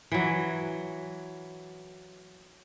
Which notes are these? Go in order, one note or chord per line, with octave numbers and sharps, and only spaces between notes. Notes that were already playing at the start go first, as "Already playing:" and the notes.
E3 F#3